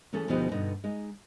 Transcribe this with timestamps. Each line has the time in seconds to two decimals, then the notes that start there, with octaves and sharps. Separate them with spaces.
0.13 E3 A3 C#4 G#4 A4
0.28 D2 B2 F3 B3 D#4 G4
0.51 G2 B2 D3 B3 D#4
0.84 G#3 D#4